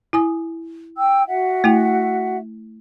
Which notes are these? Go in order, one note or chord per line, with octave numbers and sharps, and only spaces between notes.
E4 G#5 D#6
G5 E6
F#4 E5 F#5
A3 E4 G5